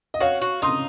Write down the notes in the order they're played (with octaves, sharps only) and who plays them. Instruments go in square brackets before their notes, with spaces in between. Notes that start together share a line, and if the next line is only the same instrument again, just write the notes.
[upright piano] D#5
[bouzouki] F#4 [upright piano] C#5 F5
[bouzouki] F#4
[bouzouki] D#4 [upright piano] C6 D#6